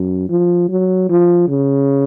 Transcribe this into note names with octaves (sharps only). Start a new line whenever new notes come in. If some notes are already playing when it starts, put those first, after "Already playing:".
Already playing: F#2
F3
F#3
F3
C#3